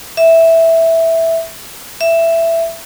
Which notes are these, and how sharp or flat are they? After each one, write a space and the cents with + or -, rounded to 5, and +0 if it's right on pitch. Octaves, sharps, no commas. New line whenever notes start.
E5 -5
E5 +10